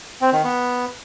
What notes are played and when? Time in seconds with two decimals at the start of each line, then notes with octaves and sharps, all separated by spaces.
0.21 C4
0.33 D#3
0.44 B3